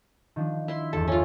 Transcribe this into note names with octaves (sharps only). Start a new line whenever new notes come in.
D#3 F3 D4
E4 C6
G1 E2 A4
C#4 F4